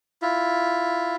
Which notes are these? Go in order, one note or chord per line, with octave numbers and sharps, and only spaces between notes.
E4 F4